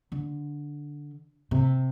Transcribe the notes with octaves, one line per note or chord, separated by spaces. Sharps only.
D3
C3